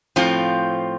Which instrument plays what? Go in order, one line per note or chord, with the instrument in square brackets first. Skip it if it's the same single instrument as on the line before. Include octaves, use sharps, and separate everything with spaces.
[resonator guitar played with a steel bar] A2 F3 C4 F4